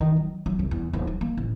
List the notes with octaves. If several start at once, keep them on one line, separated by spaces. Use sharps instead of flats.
D#3
F#3
F#3
C2
E2
D#1
F#3
A#3
A1